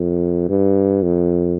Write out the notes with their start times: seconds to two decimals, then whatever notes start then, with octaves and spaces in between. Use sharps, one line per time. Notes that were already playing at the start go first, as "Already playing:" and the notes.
Already playing: F2
0.49 G2
1.03 F2